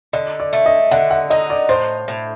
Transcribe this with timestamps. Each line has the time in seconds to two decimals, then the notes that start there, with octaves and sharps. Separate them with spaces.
0.13 D3 D#5
0.40 D5
0.53 A3
0.66 D#5
0.91 D3 F#5
1.11 F#5
1.30 D#4 D#5
1.50 D5
1.69 A2 C5
2.08 A2